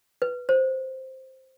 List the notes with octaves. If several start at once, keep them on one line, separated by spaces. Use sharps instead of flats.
B4
C5